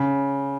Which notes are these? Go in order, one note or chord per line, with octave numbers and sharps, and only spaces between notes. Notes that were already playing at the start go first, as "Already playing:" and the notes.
Already playing: C#3